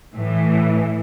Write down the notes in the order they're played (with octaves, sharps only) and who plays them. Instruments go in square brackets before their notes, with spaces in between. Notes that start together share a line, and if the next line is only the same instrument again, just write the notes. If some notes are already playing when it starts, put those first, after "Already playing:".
[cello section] A2 E3